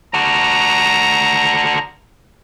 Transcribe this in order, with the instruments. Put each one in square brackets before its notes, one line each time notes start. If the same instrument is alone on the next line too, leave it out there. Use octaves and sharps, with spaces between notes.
[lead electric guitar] D4 F#4 [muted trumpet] A#5